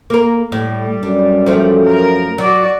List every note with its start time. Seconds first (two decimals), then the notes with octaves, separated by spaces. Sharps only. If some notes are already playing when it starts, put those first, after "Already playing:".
0.10 A#3 A#4
0.52 A2 G3
1.03 F#2 D4
1.46 F3 A3 C4
1.85 A#4
2.38 F#3 F#4 D5